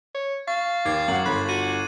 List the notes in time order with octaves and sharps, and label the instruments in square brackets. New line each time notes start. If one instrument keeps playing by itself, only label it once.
[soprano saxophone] C#5
[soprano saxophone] F5 [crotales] C#6 A6
[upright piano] D#2 [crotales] D6 G#6 C7
[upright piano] F#2 F#5 [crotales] F#7
[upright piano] G1 C6 [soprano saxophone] B5 [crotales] F#6
[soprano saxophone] F#4 [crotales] D#7